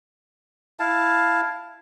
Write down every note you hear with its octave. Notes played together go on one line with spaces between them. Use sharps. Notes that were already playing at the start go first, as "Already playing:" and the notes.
E4 F5 A5